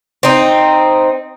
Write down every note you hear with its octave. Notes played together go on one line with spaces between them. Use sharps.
C4 D#4